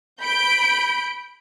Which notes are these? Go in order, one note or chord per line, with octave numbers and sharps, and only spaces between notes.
B5 G6 D7